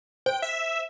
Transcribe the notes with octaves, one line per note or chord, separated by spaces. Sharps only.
C5 G5
E5